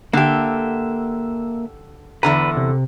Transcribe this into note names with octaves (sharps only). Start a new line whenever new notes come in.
D3 A#3 G4 E5
E2 D3 B4 A#5
C3